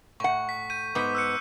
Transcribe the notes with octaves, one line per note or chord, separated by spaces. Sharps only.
A2 F#5 C#6
B6
G6 D#7
G#2 B3 D6 G6 B6
E6 F#6 C#7